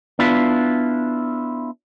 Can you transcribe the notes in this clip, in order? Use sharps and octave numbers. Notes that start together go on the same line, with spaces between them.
B3 D4 E4 F4